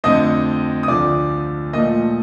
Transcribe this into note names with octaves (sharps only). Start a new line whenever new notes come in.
F2 D3 A3 C4 D#5 D#6
D#6
D2 D3 F3 D5 D6
A#2 F3 A3 D#5 D#6